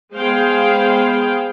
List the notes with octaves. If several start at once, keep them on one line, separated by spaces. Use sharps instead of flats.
G#3 B3 G#4 C5 F5 G5